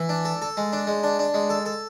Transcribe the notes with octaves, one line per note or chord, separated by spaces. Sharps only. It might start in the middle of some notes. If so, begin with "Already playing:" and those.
Already playing: E3
D4
A4
A4
G#3
D4
G#3
D4
D4
G#3
A4
A4